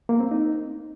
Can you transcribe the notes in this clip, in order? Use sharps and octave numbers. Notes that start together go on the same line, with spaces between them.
A#3
C4
D#4